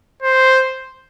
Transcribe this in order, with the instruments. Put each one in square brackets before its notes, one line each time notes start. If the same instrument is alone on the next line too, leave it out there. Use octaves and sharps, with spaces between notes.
[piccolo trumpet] C5